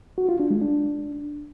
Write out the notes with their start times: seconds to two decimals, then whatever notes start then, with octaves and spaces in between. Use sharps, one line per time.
0.18 F#4
0.29 F4
0.40 D4
0.50 G#3
0.61 D4